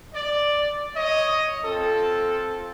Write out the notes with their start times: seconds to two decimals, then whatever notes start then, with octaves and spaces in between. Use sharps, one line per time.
0.14 D5
0.94 C#5 D#5
1.63 C4 F4 A4